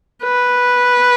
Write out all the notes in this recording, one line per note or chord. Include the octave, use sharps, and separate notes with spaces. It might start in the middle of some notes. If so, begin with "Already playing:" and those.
B4